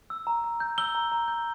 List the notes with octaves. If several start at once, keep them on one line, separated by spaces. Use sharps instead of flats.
E6
A#5
A#5
G6
E6 G7
A#5
A#5
G6